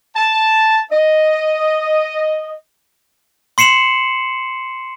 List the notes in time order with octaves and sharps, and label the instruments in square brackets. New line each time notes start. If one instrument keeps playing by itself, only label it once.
[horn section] A5
D#5
[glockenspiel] C6 C7 C#7 E7 F#7